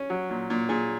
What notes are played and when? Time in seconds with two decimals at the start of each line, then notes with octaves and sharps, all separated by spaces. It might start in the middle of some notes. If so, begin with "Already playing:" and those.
Already playing: C#4
0.10 F#3
0.30 A#2
0.50 A#2
0.69 A#2 G#4